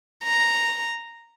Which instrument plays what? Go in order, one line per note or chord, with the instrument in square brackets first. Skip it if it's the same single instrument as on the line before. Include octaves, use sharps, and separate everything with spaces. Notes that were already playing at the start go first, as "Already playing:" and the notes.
[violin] A#5